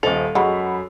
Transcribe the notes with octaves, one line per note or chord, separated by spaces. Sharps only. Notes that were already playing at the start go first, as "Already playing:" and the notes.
D#1 A4 C5 D#5 F7
F#2 G#3 F#5 B5 C#6